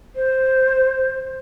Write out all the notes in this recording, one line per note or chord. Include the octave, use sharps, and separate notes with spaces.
C5